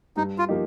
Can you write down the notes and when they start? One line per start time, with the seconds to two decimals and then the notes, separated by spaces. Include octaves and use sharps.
0.17 G2 D#4
0.38 F4
0.49 F3 A#3 D#4 G4